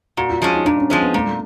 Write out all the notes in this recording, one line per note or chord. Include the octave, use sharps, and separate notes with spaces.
A#2 F#4
F4
F3 G#3 C#4 F4
D#4
A#2 D4
C#4
F3 G#3 C4 C#4
B3
A#2 A3
A3